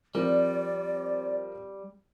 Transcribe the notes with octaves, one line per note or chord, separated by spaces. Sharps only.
F3 G3 C4 A#4 D5